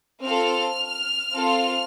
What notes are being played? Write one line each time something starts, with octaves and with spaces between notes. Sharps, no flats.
C4 F4 A4 F6
C4 F4 A4